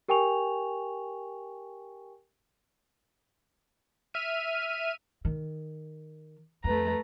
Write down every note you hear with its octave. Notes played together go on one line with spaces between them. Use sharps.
G4 A#4 G5 G#5 C#6 F7
E5 F6 D#7
D#3
F2 A3 B4 A#5